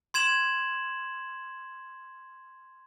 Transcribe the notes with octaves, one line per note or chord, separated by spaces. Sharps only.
C6 G#6 E7 F#7